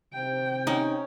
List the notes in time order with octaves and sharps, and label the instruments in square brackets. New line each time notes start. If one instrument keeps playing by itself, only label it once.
[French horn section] C3 [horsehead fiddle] G5
[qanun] C#4 [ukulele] D#4